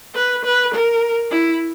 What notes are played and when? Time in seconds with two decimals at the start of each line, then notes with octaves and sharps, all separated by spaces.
0.15 B4
0.45 B4
0.74 A#4
1.31 E4